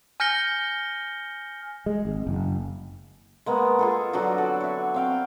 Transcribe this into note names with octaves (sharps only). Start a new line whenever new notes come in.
G#5 F6 G6 A#6 C#7 G7
G#3
G#1
F#1
G#3 A#3 B3
F4 G#4 A4
D3 F#3 D4 F#4
A4
C#5 E5
C4 F5 G5